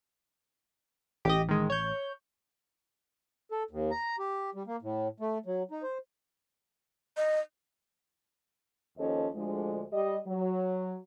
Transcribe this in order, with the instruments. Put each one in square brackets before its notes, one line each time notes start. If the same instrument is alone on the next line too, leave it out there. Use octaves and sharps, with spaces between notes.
[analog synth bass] A1 [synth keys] G4 D#5
[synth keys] D#3 G#3
C#5 G6
[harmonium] A4
D#2
A#5
G4
G3
A#3
A2
A3
F#3
D#4
C5
[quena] D#5
[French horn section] D#2 F3 C#4 A4 C5 D#5
D2 D3 F3 G#3
G3 D#5
F#3